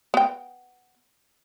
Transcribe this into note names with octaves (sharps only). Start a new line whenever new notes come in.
B3 G5